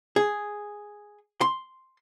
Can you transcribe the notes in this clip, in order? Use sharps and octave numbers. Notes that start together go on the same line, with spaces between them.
G#4
C6